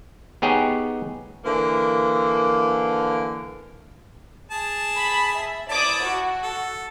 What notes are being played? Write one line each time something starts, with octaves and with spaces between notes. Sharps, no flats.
B3 D#4 G4 G#4 C#5 G5
D3 E3 A#3
G#4 A5
B5
E5
E4 D5 A5 D6 D#6
F#4
A4